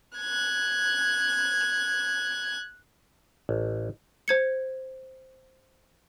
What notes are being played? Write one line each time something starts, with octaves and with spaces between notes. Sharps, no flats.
F#6 G#6
A1
C5 G#6 C#7